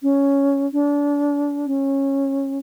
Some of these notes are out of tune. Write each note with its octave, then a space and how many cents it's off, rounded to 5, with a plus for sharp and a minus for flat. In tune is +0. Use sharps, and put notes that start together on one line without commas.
C#4 +5
D4 -30
C#4 -20